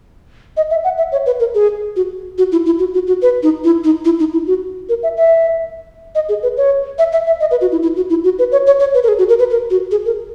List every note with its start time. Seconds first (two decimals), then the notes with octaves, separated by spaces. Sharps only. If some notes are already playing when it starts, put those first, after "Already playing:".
0.57 D#5
0.70 E5
0.84 F#5
0.98 E5
1.12 C#5
1.26 B4
1.40 A#4
1.55 G#4
1.96 F#4
2.38 F#4
2.52 E4
2.66 E4
2.79 F#4
2.94 F#4
3.07 F#4
3.22 B4
3.43 D#4
3.64 E4
3.84 D#4
4.05 E4
4.19 D#4
4.33 E4
4.47 F#4
4.89 A#4
5.03 E5
5.17 E5
6.15 D#5
6.29 G#4
6.43 B4
6.57 C#5
6.98 E5
7.13 E5
7.26 E5
7.40 D#5
7.51 B4
7.61 F#4
7.72 E4
7.82 E4
7.96 F#4
8.10 E4
8.24 F#4
8.39 B4
8.52 C#5
8.67 C#5
8.80 C#5
8.94 B4
9.03 A#4
9.08 G#4
9.18 F#4
9.29 A#4
9.39 B4
9.50 A#4
9.70 F#4
9.91 G#4
10.06 A#4